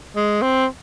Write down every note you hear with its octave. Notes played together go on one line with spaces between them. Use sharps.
G#3
C4